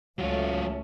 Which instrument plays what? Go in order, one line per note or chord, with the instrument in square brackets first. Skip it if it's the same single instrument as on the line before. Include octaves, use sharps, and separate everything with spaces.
[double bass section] C#2 A3 [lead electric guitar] F#3 F4 [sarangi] C#4